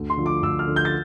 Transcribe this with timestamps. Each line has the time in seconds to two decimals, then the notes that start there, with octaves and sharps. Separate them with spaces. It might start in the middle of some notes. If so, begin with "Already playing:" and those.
Already playing: D2
0.10 C6
0.17 D3 F3
0.26 D6
0.42 D2 E6
0.59 F6
0.67 D3 F3
0.76 G6
0.85 A6